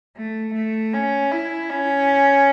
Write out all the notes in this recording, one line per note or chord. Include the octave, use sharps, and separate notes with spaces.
A3
A3
C#4
E4
C#4